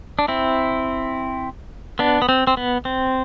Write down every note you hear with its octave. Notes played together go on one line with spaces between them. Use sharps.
D4
C4 E4
B3 D4
B3
C4
C4
B3
C4